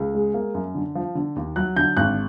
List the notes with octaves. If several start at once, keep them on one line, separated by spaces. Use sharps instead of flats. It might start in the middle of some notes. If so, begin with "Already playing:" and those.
Already playing: C#2
G#3
A#3
F#2
D3
F3
D3
D#2
F#3 F#6
D3 G6
G#1 F#6